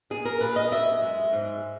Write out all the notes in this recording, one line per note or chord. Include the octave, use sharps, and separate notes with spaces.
A#2 G#4
A#4
A#2 B4
D#5
F#2 E5
G#3
G#2